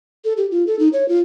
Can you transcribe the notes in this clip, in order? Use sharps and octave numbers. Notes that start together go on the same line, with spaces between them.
A4
G4
F4
A4
D#4
C#5
F4